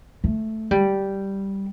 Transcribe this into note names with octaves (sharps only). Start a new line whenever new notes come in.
A3
G3